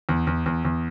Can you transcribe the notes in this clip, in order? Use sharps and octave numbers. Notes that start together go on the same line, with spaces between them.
E2
E2
E2
E2